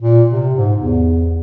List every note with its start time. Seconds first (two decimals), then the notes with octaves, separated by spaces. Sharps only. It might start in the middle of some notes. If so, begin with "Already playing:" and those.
0.01 A#2
0.30 C3
0.55 G#2
0.76 E2